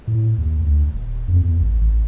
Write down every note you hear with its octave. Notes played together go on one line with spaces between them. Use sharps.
A2
D#2
D2
D#1
F2
E2
A1
A1